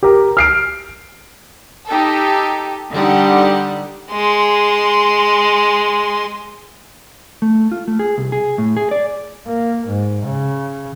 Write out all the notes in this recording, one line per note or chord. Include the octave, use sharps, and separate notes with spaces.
G4 A#4
F6 C7 D7
D#4 G4 A4
D3 G3 D#4 G4 F#5
G#3 C6
A3
F4
A3
G#4
C2
G#4
A2
G#4
D5
A#3
G#2
C#3